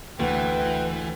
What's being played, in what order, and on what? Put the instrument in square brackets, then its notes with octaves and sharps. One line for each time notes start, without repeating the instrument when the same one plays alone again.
[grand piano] D2 [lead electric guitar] E3 [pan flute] B4 [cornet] G5